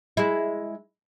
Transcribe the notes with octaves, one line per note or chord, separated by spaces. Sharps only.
G#3 E4